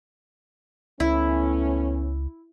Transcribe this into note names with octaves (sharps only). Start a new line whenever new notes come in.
C#2 A3 B3 C#4 E4